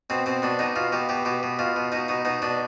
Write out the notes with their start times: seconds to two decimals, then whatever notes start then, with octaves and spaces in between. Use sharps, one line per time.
0.10 B2 C4
0.26 B2 C4
0.42 B2 D4
0.59 B2 D#4
0.76 B2 F4
0.92 B2 G4
1.09 B2 G4
1.25 B2 G4
1.43 B2
1.59 B2 F4
1.76 B2
1.92 B2 D#4
2.08 B2 D#4
2.25 B2 D#4
2.42 B2 D4